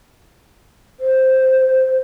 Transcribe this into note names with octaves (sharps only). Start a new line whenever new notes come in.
C5